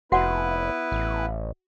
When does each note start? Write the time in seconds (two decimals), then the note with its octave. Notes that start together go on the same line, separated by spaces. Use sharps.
0.12 F1 B3 E4 F#4 B4 F#5
0.92 A1